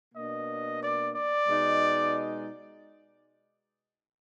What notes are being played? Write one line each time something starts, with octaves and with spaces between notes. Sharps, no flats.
B2 A#3 D4 D#5
D5
D5
B2 G#3 D#4